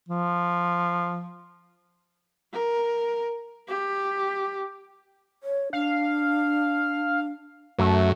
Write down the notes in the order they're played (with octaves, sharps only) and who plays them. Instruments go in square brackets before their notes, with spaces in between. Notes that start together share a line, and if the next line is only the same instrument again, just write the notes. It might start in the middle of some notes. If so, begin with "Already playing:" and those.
[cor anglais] F3
[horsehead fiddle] A#4
G4
[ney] C#5
[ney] D4 [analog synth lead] F5
[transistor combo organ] F#2 [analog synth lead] A3